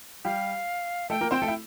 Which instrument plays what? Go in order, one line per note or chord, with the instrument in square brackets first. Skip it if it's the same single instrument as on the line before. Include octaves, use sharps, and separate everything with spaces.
[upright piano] G3 G4 [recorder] F5
[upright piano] A3 A4 [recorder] G5
[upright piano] A#3 A#4
[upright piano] C4 C5 [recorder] G5
[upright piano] A3 A4
E4